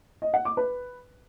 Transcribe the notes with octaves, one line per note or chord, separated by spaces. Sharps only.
D#5
F#5
D6
B4